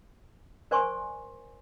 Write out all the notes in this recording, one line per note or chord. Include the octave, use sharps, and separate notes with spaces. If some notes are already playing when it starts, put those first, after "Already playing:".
A#4 C5 D5 G#5 C6 C#6